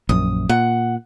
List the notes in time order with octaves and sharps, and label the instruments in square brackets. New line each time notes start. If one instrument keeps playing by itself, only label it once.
[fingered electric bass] A#1 F#2 [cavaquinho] D#6
[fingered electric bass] A#2 [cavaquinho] F#5